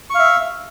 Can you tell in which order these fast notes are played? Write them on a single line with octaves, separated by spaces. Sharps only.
C#6 F5 E5